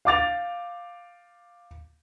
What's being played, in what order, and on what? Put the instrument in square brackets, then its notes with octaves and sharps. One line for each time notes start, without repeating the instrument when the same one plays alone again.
[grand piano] F5 D6 A6 F7